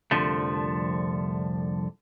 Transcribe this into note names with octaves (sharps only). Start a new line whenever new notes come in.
C2 F2 D3 F3 A3